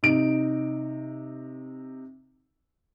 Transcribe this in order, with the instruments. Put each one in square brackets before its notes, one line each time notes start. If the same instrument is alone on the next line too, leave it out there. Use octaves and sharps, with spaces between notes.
[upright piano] C3 D#4 D7